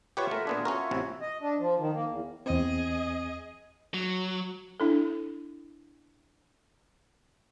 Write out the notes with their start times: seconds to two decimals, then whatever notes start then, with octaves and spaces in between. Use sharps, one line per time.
0.17 F4 G4 B4 C#5 E5 F#5
0.31 A3 A#4
0.47 A#2 B3 D4 G#4
0.65 C#4 F#4 A#4 C#5
0.91 A1 C3 E4
1.21 D#5
1.42 D4
1.59 F3
1.79 D#3
1.93 A#3
2.09 E2
2.46 E2 C4 G#4 D#5
3.94 F#3
4.80 D4 E4 A4